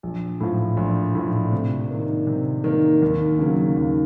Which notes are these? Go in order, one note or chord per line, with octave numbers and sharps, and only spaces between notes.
A#1
A2 F3
A#1
A2 F3
C3
D#3 A#3
C3
D#3 A#3
D#2
C#3 F#3 A#3
D#2